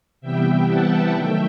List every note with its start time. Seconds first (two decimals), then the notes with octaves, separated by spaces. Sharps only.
0.21 C3 E3 G3 B3 E5 G5
0.67 F#5 A5
1.13 D#3 F#3 A3 E5 G5